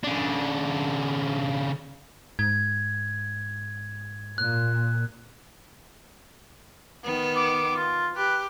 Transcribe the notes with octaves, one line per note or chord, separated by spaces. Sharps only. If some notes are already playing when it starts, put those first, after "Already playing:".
C#3 D4
G#2 G#6
A#2 F#6
D#3 B3
D6
F4
G4 B4